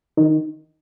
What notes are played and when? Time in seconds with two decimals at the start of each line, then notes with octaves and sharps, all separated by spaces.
0.17 D#3